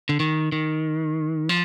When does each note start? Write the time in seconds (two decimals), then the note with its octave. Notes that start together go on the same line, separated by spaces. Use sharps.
0.09 D3
0.20 D#3
0.52 D#3
1.49 F3